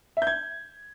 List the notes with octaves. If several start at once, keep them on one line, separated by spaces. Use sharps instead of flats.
E5
G6
G#6